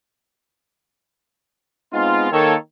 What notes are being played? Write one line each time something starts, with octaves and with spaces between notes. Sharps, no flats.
G#3 B3 C4 D#4 F4
D#3 A#3 A4 C#5